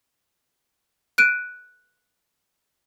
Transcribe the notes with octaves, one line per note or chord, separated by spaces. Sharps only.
F#6 D7 D#7